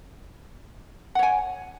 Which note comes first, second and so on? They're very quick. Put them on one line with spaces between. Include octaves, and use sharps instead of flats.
F#5 C#5 G#5